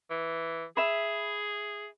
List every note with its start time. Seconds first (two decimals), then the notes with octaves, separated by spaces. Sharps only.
0.10 E3
0.77 G#4 E5 B5